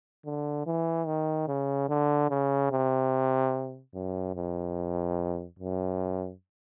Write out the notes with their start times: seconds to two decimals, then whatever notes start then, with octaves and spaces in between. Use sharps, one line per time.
0.25 D3
0.66 E3
1.06 D#3
1.48 C#3
1.89 D3
2.30 C#3
2.71 C3
3.94 F#2
4.35 F2
5.59 F#2